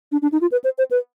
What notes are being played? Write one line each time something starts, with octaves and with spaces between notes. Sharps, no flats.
D4
D4
D#4
F4
B4
C5
C5
B4